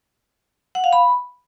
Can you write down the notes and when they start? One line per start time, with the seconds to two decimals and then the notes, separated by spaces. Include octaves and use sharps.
0.75 F#5
0.84 F5
0.93 B5